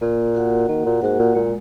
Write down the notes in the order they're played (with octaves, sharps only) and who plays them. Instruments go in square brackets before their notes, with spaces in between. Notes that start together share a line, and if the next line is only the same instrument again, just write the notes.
[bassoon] A#2 [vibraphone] A#3
[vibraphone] F#4 A#4 F#5
[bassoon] D#3 [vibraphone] A#3
[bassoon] A#2
[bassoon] G#2 [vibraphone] F#4 A#4 F#5
[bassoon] A#2
[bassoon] A#2 [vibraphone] G#3